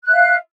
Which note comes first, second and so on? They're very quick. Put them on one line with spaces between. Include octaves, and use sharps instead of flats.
F#6 E5 F5